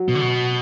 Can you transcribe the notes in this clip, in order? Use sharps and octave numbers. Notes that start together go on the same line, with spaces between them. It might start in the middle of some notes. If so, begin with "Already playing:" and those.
Already playing: F#3
B2
D3
B2